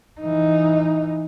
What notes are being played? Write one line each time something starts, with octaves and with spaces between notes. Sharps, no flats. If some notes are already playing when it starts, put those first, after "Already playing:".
E3 D#4